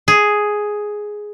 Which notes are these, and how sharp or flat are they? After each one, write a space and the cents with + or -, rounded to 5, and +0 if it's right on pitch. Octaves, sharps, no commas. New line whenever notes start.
G#4 +5